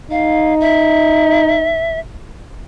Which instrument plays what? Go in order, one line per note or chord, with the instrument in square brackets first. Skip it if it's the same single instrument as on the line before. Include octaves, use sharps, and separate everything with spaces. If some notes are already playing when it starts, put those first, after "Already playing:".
[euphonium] D#4 [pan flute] F5
[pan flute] E5